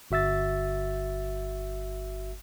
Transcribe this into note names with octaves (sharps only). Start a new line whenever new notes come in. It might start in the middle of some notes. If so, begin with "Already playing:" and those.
G1 F#4 E5 E6 A6